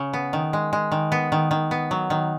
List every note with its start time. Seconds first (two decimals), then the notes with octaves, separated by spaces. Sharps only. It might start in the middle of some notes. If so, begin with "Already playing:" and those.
Already playing: C#3
0.13 B3
0.33 D#3
0.53 G#3
0.73 G#3
0.92 D#3
1.12 B3
1.32 D#3
1.51 D#3
1.71 B3
1.91 F#3
2.10 D#3